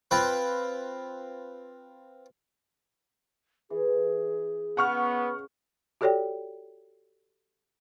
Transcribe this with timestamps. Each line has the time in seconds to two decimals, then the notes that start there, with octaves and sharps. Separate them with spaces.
0.11 C4 F4 B4
3.70 E3 G#4
4.77 C#3 B3 F#5 C#6 F6
6.01 F#4 G4 A4 C#5 D5 G5